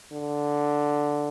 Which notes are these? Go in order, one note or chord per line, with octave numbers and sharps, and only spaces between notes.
D3